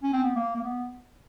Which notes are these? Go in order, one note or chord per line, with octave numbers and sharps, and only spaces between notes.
C#4
C4
B3
A#3
A#3
B3